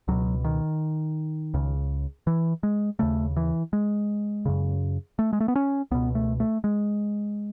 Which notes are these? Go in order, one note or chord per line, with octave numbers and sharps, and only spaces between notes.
C#2 B2 F#3
D#3
C#2 C#3
E3
G#3
D#2 C#3 A3
E3
G#3
F#2 C#3
A3
G#3
A3
B3
C#4
C#2 B2 B3
A3
A3
G#3